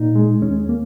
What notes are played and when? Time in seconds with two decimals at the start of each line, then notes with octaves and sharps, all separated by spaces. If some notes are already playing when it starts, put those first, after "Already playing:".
Already playing: A#2 D#4
0.15 G#3
0.42 D#2 C#4
0.69 A#3